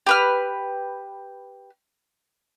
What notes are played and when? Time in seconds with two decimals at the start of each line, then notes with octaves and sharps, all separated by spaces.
0.07 G4 B4 F6